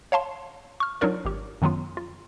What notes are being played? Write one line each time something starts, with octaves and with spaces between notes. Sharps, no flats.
C#5 F5 A5 C6
C#6 F6
F#3 D4 D#4 F4 A#4 D5
G#1 G4
F#2 D#3 F#3 B3 F4
F4